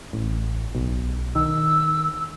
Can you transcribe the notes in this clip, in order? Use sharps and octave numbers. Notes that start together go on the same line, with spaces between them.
A1
B1
D#3 E6